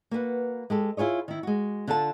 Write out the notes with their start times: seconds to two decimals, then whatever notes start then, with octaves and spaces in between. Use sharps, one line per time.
0.11 A#3 F#4 B4 F#5
0.70 G#3 G4 A4
0.97 E4 F4 G#4 C#5 D#5
1.28 D#3 E4
1.43 G#3 F#4
1.87 D3 D4 F4 A4 A5